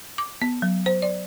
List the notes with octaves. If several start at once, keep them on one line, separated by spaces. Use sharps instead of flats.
D6
B3
F#3
C5
D5